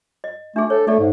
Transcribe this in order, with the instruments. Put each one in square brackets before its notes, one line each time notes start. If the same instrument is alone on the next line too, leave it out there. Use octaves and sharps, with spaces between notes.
[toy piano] D#5
[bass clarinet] A3 [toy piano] D4 G#4
[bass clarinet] A4 [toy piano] C#5
[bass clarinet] A3 [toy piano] A4 D5
[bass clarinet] G#2